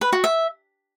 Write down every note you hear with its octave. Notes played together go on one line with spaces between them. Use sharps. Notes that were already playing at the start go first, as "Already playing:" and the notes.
B4
F#4
E5